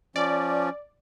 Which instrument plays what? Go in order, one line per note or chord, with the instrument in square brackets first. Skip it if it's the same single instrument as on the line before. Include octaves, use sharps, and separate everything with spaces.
[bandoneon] F3 C#4 [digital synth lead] D5